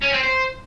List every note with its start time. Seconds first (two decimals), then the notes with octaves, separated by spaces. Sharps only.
0.02 C#4
0.13 C4
0.24 C5